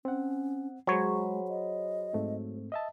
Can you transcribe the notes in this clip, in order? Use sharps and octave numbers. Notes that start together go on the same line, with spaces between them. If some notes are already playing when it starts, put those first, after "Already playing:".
C4 C#4 F#5
F#3 G#3 G#4 C5 C#5 B5
D#5
G#2 A3 C4
D#5 E5 A5